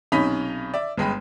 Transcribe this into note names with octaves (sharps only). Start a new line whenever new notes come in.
B1 C3 C#4 D#4 B5 B6
D5 E5
G1 G#3 G5 B5